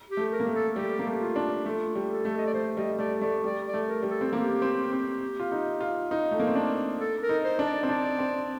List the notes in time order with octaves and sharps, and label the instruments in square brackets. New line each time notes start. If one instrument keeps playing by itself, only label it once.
[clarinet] G4
[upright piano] A3
[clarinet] A#4
[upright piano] A#3
A3
[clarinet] A4
[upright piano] G3 [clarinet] G4
[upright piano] A#3
A3
[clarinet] F4
[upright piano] D4
[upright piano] A3 [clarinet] F4
[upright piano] G3
[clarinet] A4
[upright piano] A3
[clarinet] D#5
D5
[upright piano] A3 [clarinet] C5
[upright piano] G3 [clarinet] D#5
[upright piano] A3 [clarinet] D5
[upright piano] A3 [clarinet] D5
[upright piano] G3 [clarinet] D5
[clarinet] D5
[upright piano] A3
[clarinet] A#4
[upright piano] G3
[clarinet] A4
[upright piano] C4
[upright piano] A#3 [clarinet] G4
[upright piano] C4
C4
F4
D#4
F4
D#4
A3
A#3
C4
D4
[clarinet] A4
A#4
[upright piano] D#4
[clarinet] C5
[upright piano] D4
[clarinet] D5
[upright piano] C4
[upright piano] D4 [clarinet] D5
[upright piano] C4